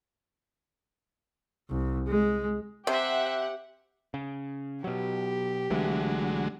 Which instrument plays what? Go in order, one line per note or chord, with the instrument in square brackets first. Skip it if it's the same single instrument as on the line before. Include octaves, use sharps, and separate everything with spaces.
[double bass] C2
G#3
[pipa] C3 [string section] G4 F#5 [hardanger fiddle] C5 E5
[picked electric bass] C#3
[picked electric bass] B2 F#3 [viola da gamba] G4
[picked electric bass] B1 E3 A3 [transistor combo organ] D3 F#3 G#3